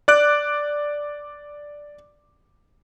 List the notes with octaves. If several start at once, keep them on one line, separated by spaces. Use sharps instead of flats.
D5 D6 F#6 D7